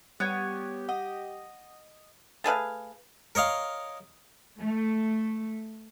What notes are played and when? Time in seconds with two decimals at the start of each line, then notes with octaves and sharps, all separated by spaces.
0.20 G3 B3 G4 C#5 F#6 G#6
0.89 D#5 F#5
2.44 A3 G#4 B4 F5
3.35 A#4 C#5 D#5 F5
4.57 A3